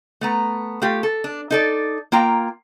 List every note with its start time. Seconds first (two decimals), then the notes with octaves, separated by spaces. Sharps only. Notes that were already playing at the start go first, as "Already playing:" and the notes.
0.21 A3 B3 A#5
0.82 A3 F4 G4
1.03 A4
1.24 D4
1.51 D#4 A4 D5
2.12 A#3 F4 G5 A#5